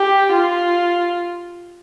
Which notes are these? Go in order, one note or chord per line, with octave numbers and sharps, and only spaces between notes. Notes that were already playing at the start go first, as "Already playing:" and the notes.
Already playing: G4
F4